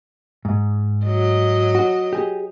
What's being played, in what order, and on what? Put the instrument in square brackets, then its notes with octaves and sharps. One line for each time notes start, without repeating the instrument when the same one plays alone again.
[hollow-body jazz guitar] G#2
[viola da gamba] F#3 D#5
[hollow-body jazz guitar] F#4
G4 G#4